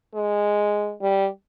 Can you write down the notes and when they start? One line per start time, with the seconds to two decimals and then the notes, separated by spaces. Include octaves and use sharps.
0.15 G#3
1.02 G3